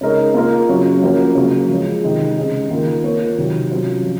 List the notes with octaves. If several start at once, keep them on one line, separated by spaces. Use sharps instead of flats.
C#3 G#3 D#4 A#4 C#5
A#3 F4 A#4
C#3 F#3 C#4
F3 A#3 C#4 F#4 A#4
C#3 F#3 A#3
F3 G#3 C#4
C3 D#3 G#3 D#4 G#4
C#3 G#3 D#4 G#4
D#3 A#3 F4 A#4
A#3 F4 A#4 C#5
C3 D#3 F#3
C3 F#3 C#4 F4
F3